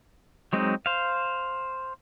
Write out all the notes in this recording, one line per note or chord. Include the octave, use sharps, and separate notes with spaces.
F#3 G#3 C4 D#4
C5 F5